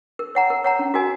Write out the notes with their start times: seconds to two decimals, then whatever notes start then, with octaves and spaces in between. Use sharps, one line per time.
0.19 A#4
0.35 C#5 F#5 A#5
0.50 A#4
0.64 C#5 F#5 A#5
0.79 C#4
0.94 F#4 A#4 D#5 G#5